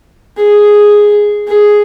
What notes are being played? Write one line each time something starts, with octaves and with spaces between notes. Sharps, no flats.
G#4
G#4